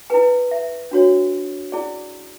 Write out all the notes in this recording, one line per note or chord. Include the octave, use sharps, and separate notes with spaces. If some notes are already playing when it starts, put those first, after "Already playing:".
E4 B4 G#5
E5
D4 F#4 C#5
C#4 E4 G#4 D5